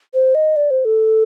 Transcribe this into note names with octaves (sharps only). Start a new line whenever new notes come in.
C5
D#5
D5
C5
A4